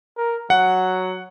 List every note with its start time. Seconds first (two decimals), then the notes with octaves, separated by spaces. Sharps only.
0.17 A#4
0.50 F#3 F#5